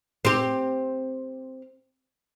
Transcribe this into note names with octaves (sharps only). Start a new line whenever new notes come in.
C4 G4